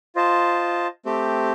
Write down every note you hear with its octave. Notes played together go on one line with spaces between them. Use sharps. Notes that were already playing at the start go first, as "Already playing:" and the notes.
F4 C5 D#5 A5
A3 C4 G4